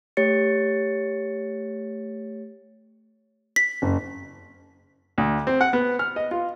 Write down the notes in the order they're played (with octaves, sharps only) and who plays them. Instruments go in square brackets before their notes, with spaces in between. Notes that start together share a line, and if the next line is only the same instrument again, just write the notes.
[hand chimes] A3 G4 C#5 A6 C#7
[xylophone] B6
[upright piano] F#1
[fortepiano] D2
C4
F#5
B3
F6
D#5
F4